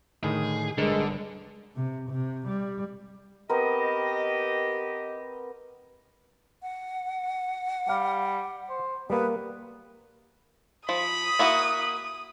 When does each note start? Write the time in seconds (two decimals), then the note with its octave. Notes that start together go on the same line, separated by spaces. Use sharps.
0.24 A2 D3 D#3 G#4
0.78 G1 D3 G#3 D4 A4 A#4
1.76 C3
2.10 C3
2.47 G3
3.49 B3 C4 G4 A#4 D#5
6.62 F#5
7.89 G3 F5
8.69 C5
9.10 G3 A#3 B3 B4
10.89 F3 B5 D#6
11.39 A#3 E4 F#4